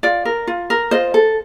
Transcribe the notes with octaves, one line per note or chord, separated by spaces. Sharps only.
F4 D5
A#4
F4
A#4
F4 C5 D#5
A4